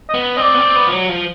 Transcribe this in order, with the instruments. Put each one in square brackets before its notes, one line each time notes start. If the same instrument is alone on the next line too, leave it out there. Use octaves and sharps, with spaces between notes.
[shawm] D#5
[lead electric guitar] B3
[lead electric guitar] C4 [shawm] D#5
[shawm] D5
[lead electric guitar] B3
C4
B3
F3
F#3
F3